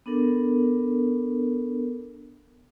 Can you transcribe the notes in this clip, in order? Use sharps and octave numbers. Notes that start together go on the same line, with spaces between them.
B3 D4 A4 A#4